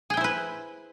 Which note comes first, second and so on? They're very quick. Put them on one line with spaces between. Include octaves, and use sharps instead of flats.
G#4 G5 E4 C5 B4